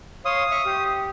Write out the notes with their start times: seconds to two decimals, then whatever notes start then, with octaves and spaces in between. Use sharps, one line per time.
0.25 C#5 F5 C6 D#6
0.51 E5 C#6 F6
0.65 G4